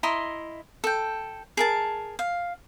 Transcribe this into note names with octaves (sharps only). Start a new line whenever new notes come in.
E4 D#5 A#5 C6
A4 G5
G#4 A#4 A5
F5